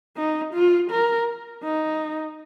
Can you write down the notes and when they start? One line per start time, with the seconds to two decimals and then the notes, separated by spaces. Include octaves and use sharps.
0.16 D#4
0.54 F4
0.91 A#4
1.64 D#4